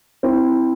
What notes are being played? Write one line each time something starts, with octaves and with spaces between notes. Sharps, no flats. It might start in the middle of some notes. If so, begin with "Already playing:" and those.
C4 E4